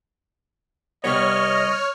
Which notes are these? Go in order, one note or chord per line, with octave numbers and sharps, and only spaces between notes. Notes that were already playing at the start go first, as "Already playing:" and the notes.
C2 G3 B3 C#5 D#5 F6